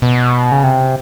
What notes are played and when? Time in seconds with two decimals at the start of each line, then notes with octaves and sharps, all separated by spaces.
0.02 B2
0.52 C#3
0.64 C3